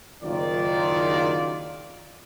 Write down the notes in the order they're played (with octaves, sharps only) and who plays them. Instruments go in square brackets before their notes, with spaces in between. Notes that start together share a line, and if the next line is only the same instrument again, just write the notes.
[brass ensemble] F#1 D#3 F4 D5